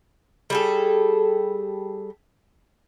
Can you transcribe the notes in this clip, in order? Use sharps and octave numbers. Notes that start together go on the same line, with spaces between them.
G3 G#4 A4